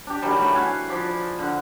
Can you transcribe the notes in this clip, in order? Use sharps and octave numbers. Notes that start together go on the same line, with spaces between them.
D4 G4
D#3 E3 F#3 G3
A3 G4
F5 F#5 G#5
F3 D5 B5
D3 F5 F#5